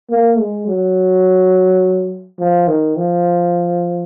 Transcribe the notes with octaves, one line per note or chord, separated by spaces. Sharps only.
A#3
G#3
F#3
F3
D#3
F3